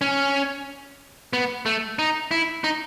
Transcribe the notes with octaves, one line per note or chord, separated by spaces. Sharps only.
C#4
B3
A3
D#4
E4
D#4